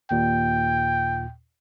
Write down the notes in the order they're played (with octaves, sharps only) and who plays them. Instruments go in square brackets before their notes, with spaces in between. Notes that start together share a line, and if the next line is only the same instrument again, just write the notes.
[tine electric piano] D#2 A#2 [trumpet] G5